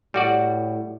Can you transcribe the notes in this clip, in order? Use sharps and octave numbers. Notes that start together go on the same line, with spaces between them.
A2 G3 F#4 D5